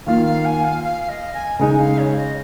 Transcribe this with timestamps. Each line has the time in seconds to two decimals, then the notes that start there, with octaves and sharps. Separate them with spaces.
0.06 D#3 A#3 F4 F5
0.26 F5
0.45 G#5
0.64 F5
0.83 F5
1.09 D#5
1.34 G#5
1.59 C#3 G#3 D#4 G#5
1.79 F5
1.98 C#5
2.16 D#5